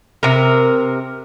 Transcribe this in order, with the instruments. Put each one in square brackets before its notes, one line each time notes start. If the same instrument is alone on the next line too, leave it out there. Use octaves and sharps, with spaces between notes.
[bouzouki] C3 A#4